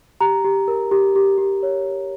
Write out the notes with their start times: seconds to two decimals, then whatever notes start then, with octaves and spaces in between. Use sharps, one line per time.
0.21 G4 A#5
0.45 G4
0.68 A#4
0.92 G4
1.16 G4
1.38 G4
1.63 C#5
1.85 G4